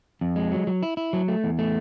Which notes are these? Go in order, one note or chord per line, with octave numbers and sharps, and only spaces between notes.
F2
G#3
F#3
F#3
E4
E4
F#3
A3
E2
A3